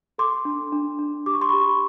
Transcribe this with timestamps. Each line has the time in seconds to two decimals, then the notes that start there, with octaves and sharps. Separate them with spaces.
0.18 A4 C6 D6
0.45 D4
0.72 D4
0.99 D4
1.26 G4 D6
1.34 C#6
1.41 C6
1.49 G4 B5 C#6